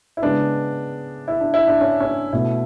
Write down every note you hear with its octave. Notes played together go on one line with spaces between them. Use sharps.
E4
C#3 G#3 B3 D4
E4
D4
E4
D4
C#4
C#4
D4
B2 A3 E4